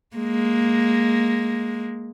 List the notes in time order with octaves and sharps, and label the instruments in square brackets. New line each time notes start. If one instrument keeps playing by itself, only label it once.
[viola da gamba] G#3 A#3